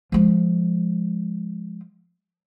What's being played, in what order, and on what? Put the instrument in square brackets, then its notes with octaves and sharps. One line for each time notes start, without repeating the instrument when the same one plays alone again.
[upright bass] F3 G#3